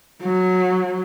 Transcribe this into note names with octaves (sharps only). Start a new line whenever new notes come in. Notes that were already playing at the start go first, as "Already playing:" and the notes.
F#3